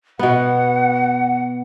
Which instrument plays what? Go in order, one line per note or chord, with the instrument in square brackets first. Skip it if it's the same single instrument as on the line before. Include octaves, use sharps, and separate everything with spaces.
[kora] B2 B3 [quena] F#5